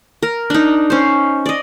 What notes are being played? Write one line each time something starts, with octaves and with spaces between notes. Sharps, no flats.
A#4
D4 D#4
C#4 C5
D5 D#5